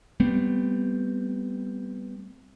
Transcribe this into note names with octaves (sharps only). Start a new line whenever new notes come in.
G3 A3 B3 C4